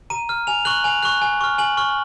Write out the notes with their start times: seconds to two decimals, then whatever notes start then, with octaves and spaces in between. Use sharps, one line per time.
0.10 A#5 D#7
0.29 F6
0.47 G#5 F7
0.65 C#6 F#6 F#7
0.84 G#5 F7
1.03 C#6 F#6
1.21 G#5
1.41 C#6 F6
1.58 G#5 F#7
1.77 C#6 F6